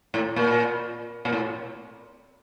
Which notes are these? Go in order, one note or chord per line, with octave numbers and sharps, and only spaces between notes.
A2
A#2
A#2
A2